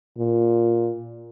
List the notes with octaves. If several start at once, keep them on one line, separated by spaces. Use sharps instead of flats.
A#2